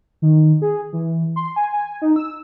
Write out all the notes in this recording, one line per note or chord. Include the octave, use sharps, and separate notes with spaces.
D#3
G#4
E3
C6
G#5
G#5
D#4
E6